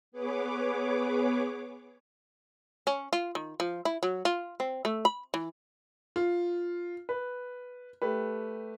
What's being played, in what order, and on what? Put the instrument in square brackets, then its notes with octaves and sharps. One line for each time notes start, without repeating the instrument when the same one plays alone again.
[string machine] B3 G#4 B4 C#5 D6
[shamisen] C#4
F4
D#3
F3
E4
F#3
F4
C4
A3
B5
E3
[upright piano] F4
B4
A3 G4 B4